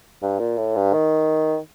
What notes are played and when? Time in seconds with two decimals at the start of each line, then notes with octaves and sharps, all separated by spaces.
0.22 G2
0.39 A#2
0.57 A2
0.76 G2
0.93 D#3